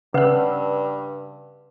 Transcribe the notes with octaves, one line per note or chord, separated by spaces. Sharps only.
G2 C#3 B4 F#5 E6